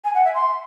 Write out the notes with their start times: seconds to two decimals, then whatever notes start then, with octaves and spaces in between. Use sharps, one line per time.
0.05 G#5
0.14 F#5
0.24 E5
0.34 C6